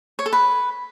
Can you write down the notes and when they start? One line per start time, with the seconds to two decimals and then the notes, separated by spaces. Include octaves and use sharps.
0.19 C#5
0.26 A4
0.33 B4